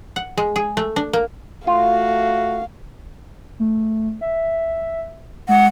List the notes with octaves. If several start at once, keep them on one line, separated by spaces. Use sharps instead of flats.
F#5
G#3
G#4
A3
D4
A#3
A3 F4 F#4 F5
A3
E5
G#3 F#5